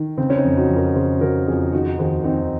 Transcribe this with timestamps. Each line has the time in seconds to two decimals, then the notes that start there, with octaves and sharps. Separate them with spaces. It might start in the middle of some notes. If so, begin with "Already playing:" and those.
Already playing: D#3
0.18 C#3 C4
0.30 C#4
0.37 C4 D#4
0.44 F2
0.57 D#4 F#4
0.69 F2
0.76 F#4 A#4
0.95 C#3 G#4 C5
1.21 C#3 F#4 A#4
1.47 F2 F4 G#4
1.72 D#3 D#4 F#4
1.99 D#2 G#4 C5
2.24 D#2 C4 D#4